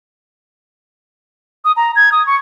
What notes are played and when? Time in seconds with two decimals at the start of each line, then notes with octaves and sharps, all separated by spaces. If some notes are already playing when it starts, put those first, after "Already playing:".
1.65 D#6
1.77 A#5
1.96 G#6
2.12 D#6
2.27 C#6